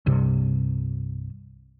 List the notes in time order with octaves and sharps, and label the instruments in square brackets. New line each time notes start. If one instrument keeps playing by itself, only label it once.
[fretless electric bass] C2 G2 C3